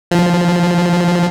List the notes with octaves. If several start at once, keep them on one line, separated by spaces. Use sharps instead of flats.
F3